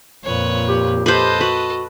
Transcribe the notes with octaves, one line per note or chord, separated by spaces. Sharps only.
F2 A#2 B4 C#5
G4
G4 A4 B4 C5 D#5
F#4 B4